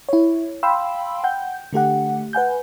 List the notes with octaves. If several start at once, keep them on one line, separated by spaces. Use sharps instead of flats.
E4 C#5
F5 G5 B5 C6 E6
F#5 G5 G6
D3 A3 G4 F#5
B4 F#5 G#5 G6